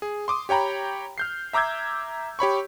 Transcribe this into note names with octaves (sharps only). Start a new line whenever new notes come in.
G#4
C6 D6 D#6
G4 C#5 G5 A#5 B5
F6 G6 C7
E5 A#5 D6 E6 G6 G#6
G4 C#5 B5 C#6